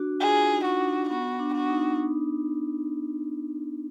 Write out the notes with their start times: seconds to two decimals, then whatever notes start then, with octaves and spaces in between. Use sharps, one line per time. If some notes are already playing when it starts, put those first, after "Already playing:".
Already playing: D4 F#4
0.20 F4 G#4
0.50 D#4
0.64 F#4
0.80 D4
1.09 B3 F#4
1.39 D4
1.54 F#4
1.69 D#4